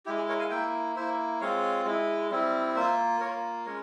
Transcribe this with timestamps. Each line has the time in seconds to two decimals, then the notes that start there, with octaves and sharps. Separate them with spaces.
0.06 G#3 E4 G4
0.18 G#4
0.29 A#4 C#5
0.39 F5 G#5
0.50 A#3 E4 E5 G5
0.96 A#3 E4 C5 E5
1.41 G#3 C4 F4 C#5 F5
1.86 G#3 E4
2.31 G3 C4 E4
2.75 A#3 F4 C5 E5
3.20 A#3 F4 A#4 C#5
3.65 G#3 C#4 A#4 C#5